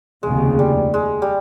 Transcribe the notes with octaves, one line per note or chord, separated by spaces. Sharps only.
F1 D#2 C#3 G#3
G3
G#3
G3